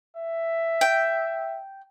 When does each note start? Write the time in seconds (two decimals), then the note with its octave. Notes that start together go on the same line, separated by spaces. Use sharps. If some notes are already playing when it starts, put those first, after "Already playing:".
0.16 E5
0.81 G5